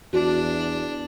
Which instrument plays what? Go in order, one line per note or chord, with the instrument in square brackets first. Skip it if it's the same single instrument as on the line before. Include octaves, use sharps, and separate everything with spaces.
[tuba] E2 [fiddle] D4 [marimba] F#4